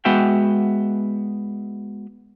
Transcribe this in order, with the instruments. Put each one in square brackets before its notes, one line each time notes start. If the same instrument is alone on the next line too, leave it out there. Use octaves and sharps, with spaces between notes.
[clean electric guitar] G#3 B3 F#4 E5 G5